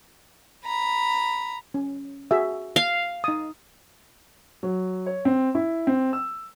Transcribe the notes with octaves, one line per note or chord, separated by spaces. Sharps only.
A#5 B5
C#4
F#4 G#4 E5
F5
D#4 D#6
F#3
C#5
C4
E4
C4
E6